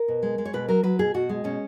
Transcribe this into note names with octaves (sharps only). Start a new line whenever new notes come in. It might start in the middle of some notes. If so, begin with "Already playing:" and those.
Already playing: A#4
B2
G#3
G#3
C#5
B2 B4
F#3 A#4
F#3 B4
B2 G#4
B2 F#4
G#3
B2 C#4